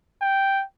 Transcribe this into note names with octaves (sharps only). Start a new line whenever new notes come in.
G5